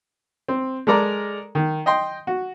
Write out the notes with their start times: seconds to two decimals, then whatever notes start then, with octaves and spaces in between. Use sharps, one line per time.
0.48 C4
0.87 G#3 A4 A#4 D5 A#5
1.55 D#3
1.86 D#5 G5 C6
2.27 F#4